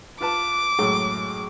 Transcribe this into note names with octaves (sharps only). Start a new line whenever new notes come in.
F4 B4 A5 D6
F#2 A2 G#3